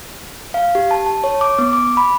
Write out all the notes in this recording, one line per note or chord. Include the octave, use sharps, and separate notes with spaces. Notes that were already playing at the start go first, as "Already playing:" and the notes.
F5
G4
A5
A5
C#5
D6
B3
D6
B5